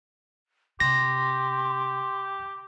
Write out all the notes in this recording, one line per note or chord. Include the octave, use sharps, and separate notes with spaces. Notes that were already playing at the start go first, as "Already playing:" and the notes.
C3 G4 C6 A#6